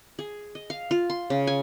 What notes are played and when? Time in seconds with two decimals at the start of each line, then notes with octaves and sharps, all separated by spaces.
0.19 G#4
0.55 D#5
0.70 F5
0.91 F4
1.10 C6
1.30 C#3
1.47 G#5